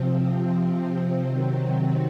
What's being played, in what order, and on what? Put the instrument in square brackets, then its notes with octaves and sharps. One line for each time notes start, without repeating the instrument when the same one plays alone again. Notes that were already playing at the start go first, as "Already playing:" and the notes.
Already playing: [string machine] C3 F3 C4
C4
C3 D#3 F#3